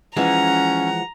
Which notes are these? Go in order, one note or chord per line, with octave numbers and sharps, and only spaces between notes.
E3 F3 G#3 C#4 F#5 A#5